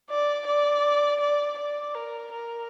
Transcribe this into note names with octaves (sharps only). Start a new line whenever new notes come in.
D5
D5
D5
D5
A#4
A#4